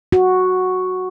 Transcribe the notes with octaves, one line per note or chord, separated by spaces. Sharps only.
F#4